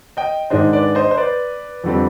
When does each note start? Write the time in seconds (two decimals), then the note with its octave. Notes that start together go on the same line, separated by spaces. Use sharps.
0.17 D#5 G5
0.50 G#2 D#3 G#3 D4 C5 D#5
0.73 B4 D5
0.95 C5 D#5
1.11 C5
1.17 B4 D5
1.84 F2 D3 G3 C4